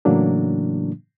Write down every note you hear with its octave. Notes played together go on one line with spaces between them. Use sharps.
A2 C#3 E3 F#3 A#3 D4